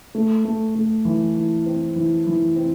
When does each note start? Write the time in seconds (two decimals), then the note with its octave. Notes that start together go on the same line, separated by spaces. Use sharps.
0.15 A3
0.45 A3
0.75 A3
1.05 E3
1.36 E3
1.66 C4
1.96 E3
2.26 E3
2.56 C4